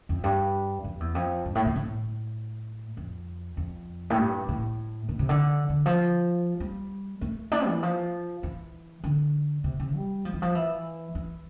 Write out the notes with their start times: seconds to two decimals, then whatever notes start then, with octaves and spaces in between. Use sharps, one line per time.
0.09 F2
0.24 G2
0.84 F2
1.00 E2
1.15 F2
1.45 G2
1.55 A2
1.66 B2
1.76 A2
2.97 F2
3.57 F2
4.10 A2
4.18 G2
4.49 A2
5.09 A2
5.19 C3
5.29 D3
5.69 D3
5.86 F3
6.60 G3
7.21 A3
7.52 D4
7.67 E3
7.83 F3
8.43 E3
9.04 D3
9.64 C3
9.80 C3
9.95 G3
10.25 F3
10.33 E3
10.42 F3
10.55 E3
11.15 E3